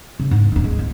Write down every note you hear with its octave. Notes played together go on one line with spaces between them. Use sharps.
C#3
G#2
D1 D#4
G#3
C#2